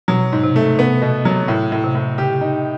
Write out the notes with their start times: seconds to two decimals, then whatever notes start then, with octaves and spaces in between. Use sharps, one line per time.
0.08 B2 F#3
0.32 G#2
0.44 C3
0.56 A3
0.79 C3 B3
1.02 B2
1.25 F#3
1.48 A2
1.72 A2
1.84 C3
1.95 A2
2.18 C#3 G4
2.41 D#4